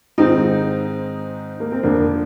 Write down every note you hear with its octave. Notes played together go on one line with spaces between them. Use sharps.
G#2 D#3 G#3 C4 D#4
A#3
C4
F2 D3 F3 A#3 D4